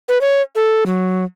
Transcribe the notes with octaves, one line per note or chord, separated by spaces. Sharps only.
B4
C#5
A4
F#3